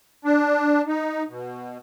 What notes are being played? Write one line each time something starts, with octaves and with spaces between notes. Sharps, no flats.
D4
D#4
B2